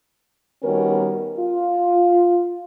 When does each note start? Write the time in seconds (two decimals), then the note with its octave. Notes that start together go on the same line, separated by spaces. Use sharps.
0.63 D#3 G3 B3 C#4 F#4 A#4
1.38 F4